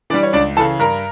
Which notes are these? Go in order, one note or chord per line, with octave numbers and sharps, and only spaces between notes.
E3 G3 D4 D5
C#5
C#2 D4 D5
C#3 E3 A4 A5
G2 A#4 A#5